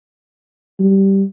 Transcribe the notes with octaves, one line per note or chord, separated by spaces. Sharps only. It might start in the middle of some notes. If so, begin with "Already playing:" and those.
G3